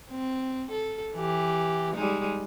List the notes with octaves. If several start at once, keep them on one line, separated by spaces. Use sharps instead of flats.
C4
A4
E3 G4
G3 G#3 D#4